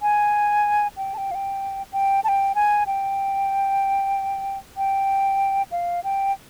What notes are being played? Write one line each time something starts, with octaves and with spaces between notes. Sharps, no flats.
G#5
G5
A5
G5
F5
G5
G5
A5
G5
G#5
G5
G5
F5
G5